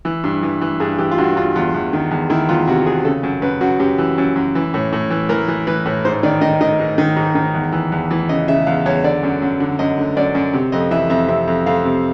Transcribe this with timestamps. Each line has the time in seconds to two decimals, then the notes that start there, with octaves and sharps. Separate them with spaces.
0.05 E3
0.24 G2
0.43 E3
0.61 E3
0.80 G2 G#4
0.98 E3 G4
1.11 F4
1.18 G2 F#4
1.36 G2 F4
1.56 E2 F4
1.74 E2
1.93 D#3
2.11 E2
2.30 D#3 E4
2.49 E2 F4
2.67 C3 F#4
2.86 C3 G#4
3.05 C#3 A4
3.23 F#2
3.42 F#2 B4
3.61 F#2 F#4
3.80 F#2 G4
3.98 E3
4.18 F#2
4.36 F#2
4.55 E3
4.74 A2
4.93 A2
5.10 E3
5.29 E3 A#4
5.48 E3
5.67 E3 B4
5.86 A2
6.05 G#2 C5
6.23 D#3 D5
6.41 D#3 D#5
6.61 D#3 D#5
6.79 G#2
6.98 D#3
7.16 G#2
7.35 D#3
7.55 E2
7.72 E3
7.92 E2
8.11 E3
8.29 C#3 D#5
8.48 C#3 E5
8.66 E2 F5
8.86 E2 C#5
9.04 D3 D5
9.23 F#2
9.42 F#2
9.60 D3
9.79 F#2 D#5
9.98 D3
10.17 F#2 D5
10.35 F#2
10.54 C3
10.72 F2 D#5
10.91 E3 E5
11.10 F2 E5
11.28 C3 E5
11.47 F2
11.66 F2 F5
11.85 C3